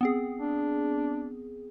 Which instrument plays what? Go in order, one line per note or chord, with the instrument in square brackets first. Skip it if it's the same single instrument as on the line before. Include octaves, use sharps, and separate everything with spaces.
[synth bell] B3 C4 G#4
[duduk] D4